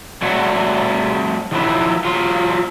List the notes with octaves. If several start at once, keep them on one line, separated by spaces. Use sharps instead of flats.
G3 A3 F#4 C#5 F#5
D#3 F3 F#3 E4
F#3 F4